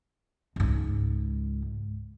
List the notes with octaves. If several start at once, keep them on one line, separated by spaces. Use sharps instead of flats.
C#2 G#2